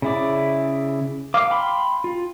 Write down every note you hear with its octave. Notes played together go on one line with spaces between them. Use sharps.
C#3 E4 D5
F5 D6
G5 B5 C6
F4